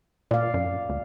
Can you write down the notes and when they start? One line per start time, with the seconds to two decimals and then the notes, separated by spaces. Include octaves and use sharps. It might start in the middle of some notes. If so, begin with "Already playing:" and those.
0.31 A#2 D5 F5
0.54 F#2
0.89 D2